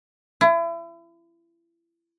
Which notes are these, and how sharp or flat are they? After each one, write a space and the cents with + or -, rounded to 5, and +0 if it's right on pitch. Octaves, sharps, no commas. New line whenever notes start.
E4 +35